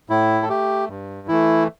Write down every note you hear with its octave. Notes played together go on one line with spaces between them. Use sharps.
A2 E4
A4
A3 G4
G2
E3 A3 E4